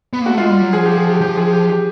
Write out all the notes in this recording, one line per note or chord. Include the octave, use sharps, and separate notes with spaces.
B3
A#3
A3 F#4
G#3 F4
G3
F#3
F3 G#4
G4
G#4
G4
F3 G4
G#4
G4
G4